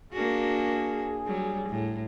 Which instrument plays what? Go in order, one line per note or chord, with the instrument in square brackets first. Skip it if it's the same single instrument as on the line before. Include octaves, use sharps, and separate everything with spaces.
[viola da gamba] A#3 D4 F#4 [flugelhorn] G#4
[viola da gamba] F#3 G3
A2